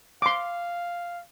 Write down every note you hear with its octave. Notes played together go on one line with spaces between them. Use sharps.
F5 C6 D6